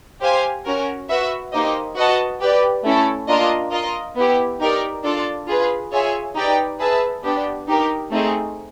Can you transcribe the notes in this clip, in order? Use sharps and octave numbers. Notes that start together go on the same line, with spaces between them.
G4 C5 F5 G#5
C#4 F#4 A#4
F#4 B4 E5
A#3 D#4 G4 C5 D#5
F#4 B4 D#5 F#5 A5
G4 B4 D5
A3 C#4 E4 A4
A#3 D4 F4 A#4 D#5
F4 A#4 D#5
B3 E4 G4
D#4 G4 A#4 D5
D4 F4 A4 D5
F4 G#4 B4
F4 G#4 C#5 E5 G#5
D#4 G4 B4 D5 G5
G#4 B4 E5 A5
B3 D4 G4
D#4 G4 A#4
A3 C4 D#4 G#4